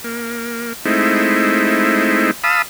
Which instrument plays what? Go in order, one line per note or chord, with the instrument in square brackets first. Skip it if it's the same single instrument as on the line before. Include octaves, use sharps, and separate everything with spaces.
[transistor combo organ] A#3
G#3 A3 C4 D#4 E4
F5 A5 B5 D#6 E6